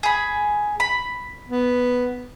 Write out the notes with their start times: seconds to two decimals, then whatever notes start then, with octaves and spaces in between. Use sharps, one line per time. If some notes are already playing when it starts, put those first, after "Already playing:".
0.03 G#4 B5
0.80 B5
1.48 B3